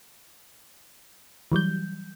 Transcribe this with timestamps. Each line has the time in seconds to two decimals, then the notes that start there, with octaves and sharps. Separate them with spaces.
1.52 E3 F#3 G3 G6